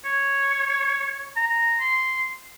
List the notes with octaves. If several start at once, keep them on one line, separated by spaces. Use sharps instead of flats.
C#5
A#5
C6